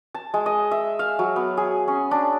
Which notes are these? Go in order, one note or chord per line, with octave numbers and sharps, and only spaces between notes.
A5
G#3
D#5
E5
F5
F#3
B3
G#4
C#4
D4